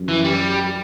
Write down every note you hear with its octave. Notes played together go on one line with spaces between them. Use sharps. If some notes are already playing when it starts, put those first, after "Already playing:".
Already playing: F#2
E3
G3